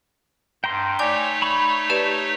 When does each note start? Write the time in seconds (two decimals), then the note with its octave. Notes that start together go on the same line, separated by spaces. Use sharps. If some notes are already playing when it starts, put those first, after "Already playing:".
0.64 G2 G5 A#5 C6
0.99 A3 D#4 C#5 D5 G#5 D6
1.42 B5 C#6
1.90 G4 B4 D5 A5